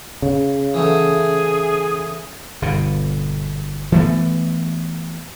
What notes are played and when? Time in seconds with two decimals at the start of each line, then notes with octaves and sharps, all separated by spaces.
0.22 C#3
0.74 E3 F#3 A3 G#4
2.62 G1 B2
3.92 E3 A3 B3